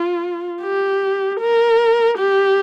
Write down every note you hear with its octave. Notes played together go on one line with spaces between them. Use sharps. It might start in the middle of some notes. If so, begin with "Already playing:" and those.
Already playing: F4
G4
A#4
G4